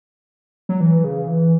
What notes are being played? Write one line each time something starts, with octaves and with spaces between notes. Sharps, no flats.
F#3
E3
C#3
E3